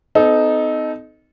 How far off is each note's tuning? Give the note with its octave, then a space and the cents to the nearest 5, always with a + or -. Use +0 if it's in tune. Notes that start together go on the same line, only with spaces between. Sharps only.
C4 -45 D#4 +0 A4 -25